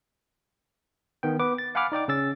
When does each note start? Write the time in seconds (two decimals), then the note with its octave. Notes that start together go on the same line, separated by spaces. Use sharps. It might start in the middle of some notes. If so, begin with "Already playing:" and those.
1.23 D#3 B3 G5
1.39 B3 B4 D6
1.58 A6
1.75 F5 F#5 G#5 B5 D6 F6
1.92 D#4 D5 G5 D6
2.08 C#3 C#4 E6 A6